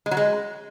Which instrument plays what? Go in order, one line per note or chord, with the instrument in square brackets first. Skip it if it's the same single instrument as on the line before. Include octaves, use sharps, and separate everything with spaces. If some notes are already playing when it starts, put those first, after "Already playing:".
[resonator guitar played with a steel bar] G#3
F#3
G#3